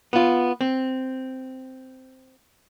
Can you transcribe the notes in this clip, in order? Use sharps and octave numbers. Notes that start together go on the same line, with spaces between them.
B3 F4
C4